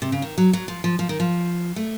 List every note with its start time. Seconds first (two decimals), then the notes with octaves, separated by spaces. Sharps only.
0.02 C3
0.12 C#3
0.22 D#3
0.38 F#3
0.53 F#3
0.68 F3
0.84 F3
0.99 F3
1.09 D#3
1.20 F3
1.76 A3